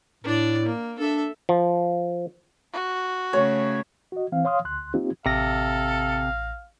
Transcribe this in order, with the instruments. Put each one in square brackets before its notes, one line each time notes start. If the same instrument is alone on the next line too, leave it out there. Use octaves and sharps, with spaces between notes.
[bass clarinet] A2 [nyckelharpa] D4 D5
[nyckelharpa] A#3
[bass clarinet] D4 [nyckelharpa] A4 E5
[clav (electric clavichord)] F3
[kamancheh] F#4
[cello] C#3 A3 [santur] C#5
[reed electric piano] F#4 D#5
E3 C4 F5
C#5 F5 C6 D#6 F6
D2 C6 F#6
A#3 C4 D#4 F4 G4
[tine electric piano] A1 A#6 [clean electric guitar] C3 [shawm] A4 [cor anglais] F5